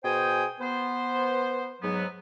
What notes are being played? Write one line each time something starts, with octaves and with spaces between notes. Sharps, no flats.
B2 G#4 C5 G5 G#5 D#6
B3 C5
G#2 F#3 B3